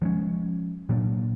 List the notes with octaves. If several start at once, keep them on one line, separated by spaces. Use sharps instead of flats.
F3 G#3 C#4
A#2 F#3 A#3 D4